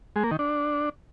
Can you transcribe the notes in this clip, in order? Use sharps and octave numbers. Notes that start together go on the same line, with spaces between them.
G#3
A#3
D#3
D4